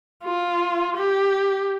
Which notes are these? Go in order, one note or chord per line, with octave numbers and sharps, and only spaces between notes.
F4
G4